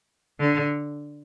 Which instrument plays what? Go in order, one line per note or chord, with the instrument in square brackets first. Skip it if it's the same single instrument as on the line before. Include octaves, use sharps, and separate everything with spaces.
[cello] D3